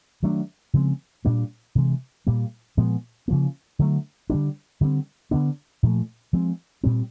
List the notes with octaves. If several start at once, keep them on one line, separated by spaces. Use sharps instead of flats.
D#3 F#3 A3 D4
C#3 F3 G#3 C4
A#2 G3 A#3 D4
C3 E3 G#3
A#2 G3 A#3
A#2 F3 G#3 B3
C#3 F3 A#3
D3 F#3 A3
D3 G3 B3 D4
D3 G3 C4
D3 F#3 B3 D4
A#2 F3 A3
F3 G#3 C4
A#2 G3 C4